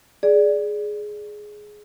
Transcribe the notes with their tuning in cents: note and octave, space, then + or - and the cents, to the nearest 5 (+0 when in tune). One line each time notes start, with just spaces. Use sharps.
G#4 +10 D5 +0